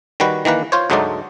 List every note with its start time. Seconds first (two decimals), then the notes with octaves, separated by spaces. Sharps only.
0.20 D#3 G3 F#4 B4
0.45 D#3 E3 A#3 B4
0.72 F4 C5 C#5
0.90 D2 G#2 F#3 A3 D#4 D5